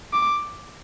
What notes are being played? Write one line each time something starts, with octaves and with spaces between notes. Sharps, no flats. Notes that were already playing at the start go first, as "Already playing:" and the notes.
D6